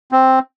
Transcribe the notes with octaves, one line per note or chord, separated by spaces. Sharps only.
C4